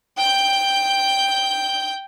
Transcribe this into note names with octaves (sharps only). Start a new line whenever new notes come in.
G5 G6